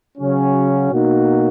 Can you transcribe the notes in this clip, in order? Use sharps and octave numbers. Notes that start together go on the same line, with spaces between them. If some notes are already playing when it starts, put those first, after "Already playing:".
C#3 F#3 C#4
B2 A#3 D#4 F#4